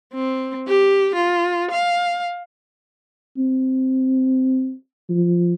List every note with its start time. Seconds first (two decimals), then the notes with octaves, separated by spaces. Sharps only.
0.14 C4
0.68 G4
1.15 F4
1.71 F5
3.38 C4
5.09 F3